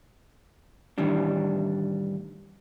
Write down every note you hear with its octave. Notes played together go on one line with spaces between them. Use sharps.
A2 D#3 E3 G3 D4